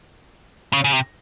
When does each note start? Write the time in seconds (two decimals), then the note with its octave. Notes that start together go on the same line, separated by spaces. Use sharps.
0.73 C#3
0.84 C#3
0.93 C3